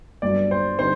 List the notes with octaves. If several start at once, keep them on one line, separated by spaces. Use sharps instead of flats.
G1 G2 F#3 D5
C5
D3 G3 C4 D#4 C5